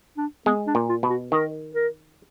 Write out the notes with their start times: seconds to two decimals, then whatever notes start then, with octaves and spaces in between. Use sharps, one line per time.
0.17 D4
0.46 G#3 B3
0.67 D4
0.75 A#2
0.89 F4
1.03 B2
1.10 F#4
1.32 D#3 A#4
1.75 A#4